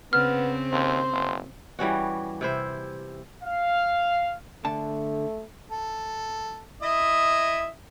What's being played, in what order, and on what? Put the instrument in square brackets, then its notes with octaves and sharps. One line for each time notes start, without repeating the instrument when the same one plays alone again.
[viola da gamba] C#3 C4 [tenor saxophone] B3 [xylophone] F6
[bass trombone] D#2 [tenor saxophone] C5
[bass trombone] F#1
[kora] E3 G3 C#4 F#4
C3 E4 C5
[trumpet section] F5
[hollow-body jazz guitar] D3 A5 [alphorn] A3
[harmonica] A4
E4 D#5 E5